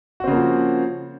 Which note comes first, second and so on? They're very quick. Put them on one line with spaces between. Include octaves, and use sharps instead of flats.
F#4 C4 C#3 A#3 F3